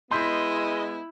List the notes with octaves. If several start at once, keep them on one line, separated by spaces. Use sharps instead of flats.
G#3 B3 E4 D#5 C6 G6 B6